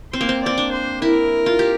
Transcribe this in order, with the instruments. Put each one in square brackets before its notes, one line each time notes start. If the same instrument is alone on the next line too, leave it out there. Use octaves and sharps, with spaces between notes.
[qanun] C4 [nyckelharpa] C5
[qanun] A#3
C4
[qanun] C4 [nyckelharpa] D5
[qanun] D4
[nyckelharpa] C5
[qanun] E4 [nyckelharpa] A#4
[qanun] F4
G4